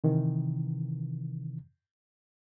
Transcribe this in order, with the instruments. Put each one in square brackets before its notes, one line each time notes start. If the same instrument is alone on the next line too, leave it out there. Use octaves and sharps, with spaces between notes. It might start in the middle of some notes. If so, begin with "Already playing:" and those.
[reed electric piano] C3 D#3 E3